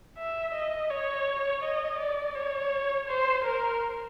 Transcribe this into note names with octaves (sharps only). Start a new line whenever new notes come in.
E5
D#5
C#5
D#5
D5
C#5
C5
A#4